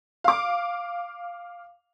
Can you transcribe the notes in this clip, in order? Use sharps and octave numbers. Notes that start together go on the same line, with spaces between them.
F5 D6